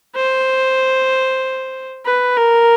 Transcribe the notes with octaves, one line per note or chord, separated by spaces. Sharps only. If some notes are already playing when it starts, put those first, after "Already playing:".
C5
B4
A#4